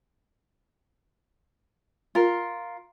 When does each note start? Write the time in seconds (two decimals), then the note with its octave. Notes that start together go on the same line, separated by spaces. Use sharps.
2.15 F4 A#4